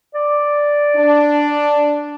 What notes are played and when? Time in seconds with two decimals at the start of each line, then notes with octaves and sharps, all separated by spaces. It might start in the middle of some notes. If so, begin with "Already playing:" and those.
0.15 D5
0.96 D4